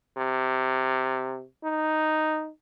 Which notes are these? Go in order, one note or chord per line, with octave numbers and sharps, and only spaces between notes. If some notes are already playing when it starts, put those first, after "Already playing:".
C3
D#4